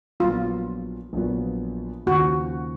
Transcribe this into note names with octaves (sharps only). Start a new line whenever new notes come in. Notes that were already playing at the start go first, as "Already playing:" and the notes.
A#1 A#2 F#3 B3 F4
A#1 A#2 F#3 B3
D#2 C#3 F3 F#4